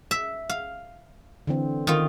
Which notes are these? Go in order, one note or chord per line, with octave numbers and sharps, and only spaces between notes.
E5
F5
D3 E3 C4
D#3 F4